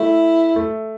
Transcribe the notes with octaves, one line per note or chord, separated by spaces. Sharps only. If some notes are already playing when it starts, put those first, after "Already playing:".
Already playing: A3 E4
A3